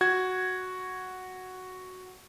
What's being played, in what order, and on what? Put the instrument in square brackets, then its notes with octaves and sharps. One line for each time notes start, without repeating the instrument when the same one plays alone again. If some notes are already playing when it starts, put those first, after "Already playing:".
[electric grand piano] F#4 G#6